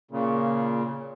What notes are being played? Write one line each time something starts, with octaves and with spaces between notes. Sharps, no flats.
A#2 C#3